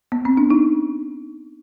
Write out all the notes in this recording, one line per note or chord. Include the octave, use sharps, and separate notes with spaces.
B3
C4
D4
D#4